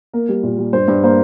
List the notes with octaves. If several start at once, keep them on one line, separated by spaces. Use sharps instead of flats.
A#3 A#4
G3
A#2
G3
G2 C5
G2
A#3 C5